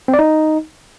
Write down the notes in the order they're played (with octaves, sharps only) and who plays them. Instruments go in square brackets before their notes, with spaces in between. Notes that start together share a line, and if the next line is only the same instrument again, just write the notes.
[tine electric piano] C4
D5
D#4